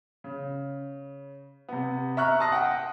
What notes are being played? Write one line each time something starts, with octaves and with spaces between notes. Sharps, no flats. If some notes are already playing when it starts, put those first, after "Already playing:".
C#3
C3 B3
E5 A#5 C#6 F6 F#6
A5 C6 D#6 A#6
F#5 G5 D#6